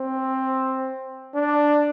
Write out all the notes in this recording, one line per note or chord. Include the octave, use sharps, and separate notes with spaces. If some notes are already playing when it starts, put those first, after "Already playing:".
Already playing: C4
D4